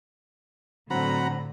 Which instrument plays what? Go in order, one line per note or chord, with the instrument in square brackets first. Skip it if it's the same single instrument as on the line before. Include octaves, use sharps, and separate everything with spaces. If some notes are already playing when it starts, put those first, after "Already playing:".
[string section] A2 D3 [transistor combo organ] F#3 C4 A#5 [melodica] F#5 B5